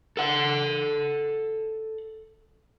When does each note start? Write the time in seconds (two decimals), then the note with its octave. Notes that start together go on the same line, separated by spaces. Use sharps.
0.17 A4 F#5